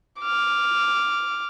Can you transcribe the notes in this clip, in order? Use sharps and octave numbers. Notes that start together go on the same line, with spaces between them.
D6 F6